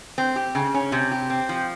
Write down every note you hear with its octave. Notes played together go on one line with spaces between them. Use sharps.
C4
G4
C#3
C#4
C3
G4
C4
F3